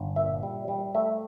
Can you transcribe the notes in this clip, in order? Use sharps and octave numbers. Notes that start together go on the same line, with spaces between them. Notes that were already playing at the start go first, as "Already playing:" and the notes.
Already playing: G1
A#2 E5
G3
G3
A3 E5